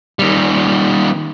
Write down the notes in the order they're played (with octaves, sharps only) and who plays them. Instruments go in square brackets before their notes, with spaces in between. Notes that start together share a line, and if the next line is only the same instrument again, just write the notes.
[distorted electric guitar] D#3 G3